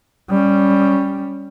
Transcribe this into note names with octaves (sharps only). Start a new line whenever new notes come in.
G3 C#4